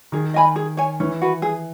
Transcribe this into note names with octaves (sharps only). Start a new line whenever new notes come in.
D#3 G#4
D#5 G#5 B5
G#4
C#5 G#5
E3 C#4
F#4 B4
G#4